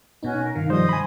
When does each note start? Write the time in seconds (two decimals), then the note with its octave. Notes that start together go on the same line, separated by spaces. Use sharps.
0.23 B2 B3 C#4 D#4 F#4
0.42 A#4
0.55 G2 C3 D#3 F5
0.70 F3 G3 C5 D#5 C6 D#6
0.89 G#5 B5